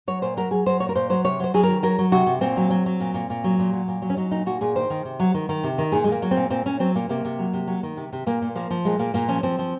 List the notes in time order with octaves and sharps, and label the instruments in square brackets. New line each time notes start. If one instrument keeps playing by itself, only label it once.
[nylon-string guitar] F#3 C#5
A#2 C5
F#3 A#4
F#3 G#4
F#3 C5
A#2 C#5
A#4
A#2 C5
F#3 C5
C3 C#5
F#3 C5
F#3 G#4
A#4
D#3
F#3 A#4
F#3
C3 F#4
C3
A#2 C4
F#3
F#3
F#3
A#2
A#2
A#2
F#3
A#2
F#3
A#2
F#3
C#4
F#3 D#4
A#2 D#4
A#2 F#4
A#2 G#4
D#3 C5
D#3
C3
F#3
D#3
D#3
C3
D#3
A#2 G#4
G#3
A#2 A#3
F#3
C4
A#2
A#2 C4
A#2 C#4
F#3 C4
A#2 A#3
C3 A#3
C3
F#3
C3
F#3
D#3
C3
C3
A#2 A#3
A#2
F3 A#3
F3
A#2 G#3
A#2 A#3
A#2 A#3
F3 C#4
F3 C4
F3